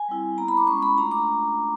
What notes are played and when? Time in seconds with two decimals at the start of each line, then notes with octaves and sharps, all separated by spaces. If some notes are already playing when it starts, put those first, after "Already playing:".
Already playing: G#5
0.09 G3 C4 E4
0.38 B3 E4 A#5
0.48 B5
0.57 D6
0.67 G#3 C#4 E4 C#6
0.82 B5
0.97 A3 D4 F4 A#5
1.11 D6